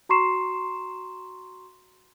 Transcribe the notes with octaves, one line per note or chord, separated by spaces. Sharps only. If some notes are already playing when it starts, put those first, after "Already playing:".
F#4 A#5 C6 C#6 C7 E7